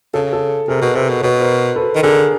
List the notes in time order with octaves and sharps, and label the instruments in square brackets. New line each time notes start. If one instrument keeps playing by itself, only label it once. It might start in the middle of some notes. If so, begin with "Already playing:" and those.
[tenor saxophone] C#3 [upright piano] A4
[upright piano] A4
[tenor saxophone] C3 [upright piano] G#4 A#4
[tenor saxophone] B2
[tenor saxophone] C3 [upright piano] A4 B4
[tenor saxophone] B2
[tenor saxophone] B2 [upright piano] B4 C#5
[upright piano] A#4 C5
A4 B4
[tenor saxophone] D#3
[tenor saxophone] D3 [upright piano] G#4 A#4